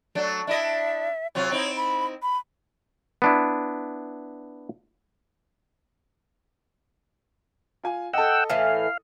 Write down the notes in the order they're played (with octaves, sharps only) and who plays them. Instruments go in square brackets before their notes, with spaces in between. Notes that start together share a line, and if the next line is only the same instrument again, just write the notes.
[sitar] F#3 A3 D4
[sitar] D4 E4 D#5 [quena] E5
[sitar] C3 F#3 F4 [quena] C#5
[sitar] C4 D#4 E4
[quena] B5
B5
[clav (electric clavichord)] B3 D4 E4
[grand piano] F4 G#5
[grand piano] A4 D#5 [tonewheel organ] F#5 G5 E6
[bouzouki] A2 E3 [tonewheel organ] F5